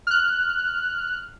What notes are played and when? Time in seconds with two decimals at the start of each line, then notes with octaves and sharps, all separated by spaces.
0.07 F6 F#6